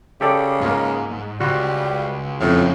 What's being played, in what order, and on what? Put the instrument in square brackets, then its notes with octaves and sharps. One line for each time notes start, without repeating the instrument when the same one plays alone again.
[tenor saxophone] C#3 [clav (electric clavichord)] G4 A4 D5
[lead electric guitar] G#2 [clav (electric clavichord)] A#3 F4
[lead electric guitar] C#2 [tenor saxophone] G3 [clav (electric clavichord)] F4 F#4
[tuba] F2 [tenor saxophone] A2 [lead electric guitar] C#3 A3